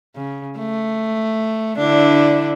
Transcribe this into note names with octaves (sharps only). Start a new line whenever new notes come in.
C#3
A3
D3 D4 E4